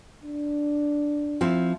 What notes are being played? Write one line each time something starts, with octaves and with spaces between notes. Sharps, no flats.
D4
F3 C4 E4